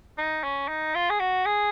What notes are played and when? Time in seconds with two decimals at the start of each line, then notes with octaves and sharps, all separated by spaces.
0.18 D#4
0.44 C#4
0.68 D#4
0.95 F4
1.10 G#4
1.20 F#4
1.46 G#4